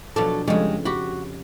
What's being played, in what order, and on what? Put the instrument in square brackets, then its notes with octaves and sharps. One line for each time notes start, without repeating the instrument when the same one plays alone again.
[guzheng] B2 F3 D4 [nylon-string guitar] F#3 A4
[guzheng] F2 C#3 [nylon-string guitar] G3 G#3
[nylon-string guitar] F#4 [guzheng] G4 B5